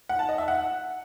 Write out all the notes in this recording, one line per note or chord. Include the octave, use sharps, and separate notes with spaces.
F#5
A5
D#5
E5
F#5